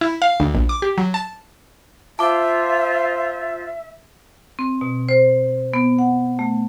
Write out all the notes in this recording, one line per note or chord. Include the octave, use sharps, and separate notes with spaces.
E4
F5
D2
A#1
D6
G4
F#3
A5
F4 C5 E5 A5 D6
C4
B2
C5
B3
F#5
A3